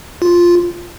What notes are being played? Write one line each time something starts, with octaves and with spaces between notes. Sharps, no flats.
F4